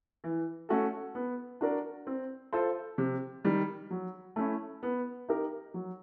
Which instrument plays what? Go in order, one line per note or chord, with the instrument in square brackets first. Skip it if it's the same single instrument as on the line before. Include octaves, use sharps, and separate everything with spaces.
[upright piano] E3
A3 C#4 F#4 A4
B3
D4 F#4 A#4 D5
C4
F4 A4 C5
C3
D#3 G3
F#3
A3 C#4 E4
B3
D#4 G4 A#4
F#3